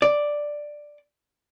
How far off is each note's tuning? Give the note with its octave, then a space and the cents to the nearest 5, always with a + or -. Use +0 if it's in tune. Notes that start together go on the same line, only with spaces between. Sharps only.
D5 +5